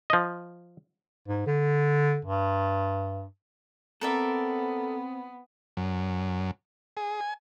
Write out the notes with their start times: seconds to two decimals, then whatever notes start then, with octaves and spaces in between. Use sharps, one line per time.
0.10 F3 D#5
1.28 G#2
1.47 D3
2.25 G2
4.01 B3 C4 A4 A#4 D5 E5
5.77 F#2
6.97 G#4
7.21 G#5